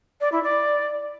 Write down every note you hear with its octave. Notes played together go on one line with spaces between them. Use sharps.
D5
E4
D5